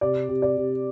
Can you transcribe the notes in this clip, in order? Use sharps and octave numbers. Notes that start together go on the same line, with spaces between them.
C3 D5
C3
D5
C3